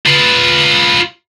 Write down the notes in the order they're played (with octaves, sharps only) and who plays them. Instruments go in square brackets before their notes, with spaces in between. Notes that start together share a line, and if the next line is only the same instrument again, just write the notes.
[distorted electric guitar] F4 B4